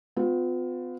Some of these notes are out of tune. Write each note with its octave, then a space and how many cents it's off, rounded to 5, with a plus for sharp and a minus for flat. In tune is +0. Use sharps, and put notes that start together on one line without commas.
B3 +45 F4 +30